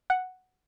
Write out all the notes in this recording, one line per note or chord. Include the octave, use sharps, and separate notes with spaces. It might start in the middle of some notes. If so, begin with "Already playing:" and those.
F#5